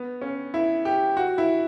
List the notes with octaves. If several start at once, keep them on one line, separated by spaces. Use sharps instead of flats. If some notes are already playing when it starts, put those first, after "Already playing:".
Already playing: B3
C#4
E4
G4
F#4
E4